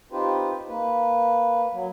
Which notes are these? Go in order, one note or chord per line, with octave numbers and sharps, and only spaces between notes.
C4 D#4 F4 G4 B4 C5
A#3 B4
F#3